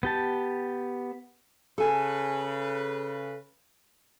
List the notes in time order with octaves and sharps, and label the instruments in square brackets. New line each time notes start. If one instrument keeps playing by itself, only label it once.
[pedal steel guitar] B3 G4 A5
[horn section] C#3 B4 [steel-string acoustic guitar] A4 G#5